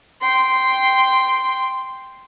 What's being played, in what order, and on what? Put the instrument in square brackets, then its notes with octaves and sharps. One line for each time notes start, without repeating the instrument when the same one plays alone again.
[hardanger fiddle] G5 C6